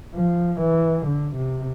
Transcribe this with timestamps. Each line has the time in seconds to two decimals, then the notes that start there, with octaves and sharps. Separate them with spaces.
0.15 F3
0.61 E3
1.06 D3
1.36 C3